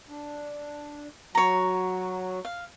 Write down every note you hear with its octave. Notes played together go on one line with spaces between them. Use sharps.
D4
F#3 F#4 C#5 A#5
F5